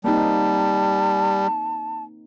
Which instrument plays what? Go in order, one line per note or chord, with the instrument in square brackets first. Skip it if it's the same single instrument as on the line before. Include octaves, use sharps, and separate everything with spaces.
[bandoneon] G3 [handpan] A#3 C4 D#4 [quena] A5